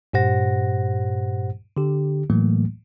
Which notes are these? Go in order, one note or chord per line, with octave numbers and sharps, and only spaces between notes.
G2 A#2 G4 C5 F#5 A#6
D3 G4
A2 E3 F#3 A3 A#3